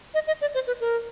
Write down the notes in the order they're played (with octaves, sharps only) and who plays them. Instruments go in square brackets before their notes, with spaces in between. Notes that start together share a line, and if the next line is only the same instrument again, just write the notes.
[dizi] D#5
D#5
D5
C5
B4
A#4